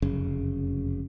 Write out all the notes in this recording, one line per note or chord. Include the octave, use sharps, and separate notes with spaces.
F1 F#2 C#3